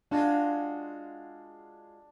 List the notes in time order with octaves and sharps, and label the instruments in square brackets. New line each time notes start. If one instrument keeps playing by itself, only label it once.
[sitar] G#3 F4 F#4 [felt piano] D4